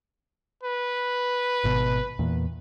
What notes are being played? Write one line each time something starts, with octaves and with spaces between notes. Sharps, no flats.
B4
G#1 B2
E2 A#2